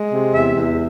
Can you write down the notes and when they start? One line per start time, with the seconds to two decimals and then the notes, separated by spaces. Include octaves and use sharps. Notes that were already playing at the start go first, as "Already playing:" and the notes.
Already playing: G#3
0.12 C3
0.34 E2 E5
0.56 E2